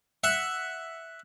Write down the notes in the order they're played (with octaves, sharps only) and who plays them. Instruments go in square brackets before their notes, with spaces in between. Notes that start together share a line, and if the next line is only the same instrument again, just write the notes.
[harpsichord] E5 F#5